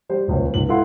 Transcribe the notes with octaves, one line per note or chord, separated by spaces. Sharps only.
G3 C5
D#1 C#2 C#4 C5
C#2 G#2 F#7
E4 A4 F5 F#5 C6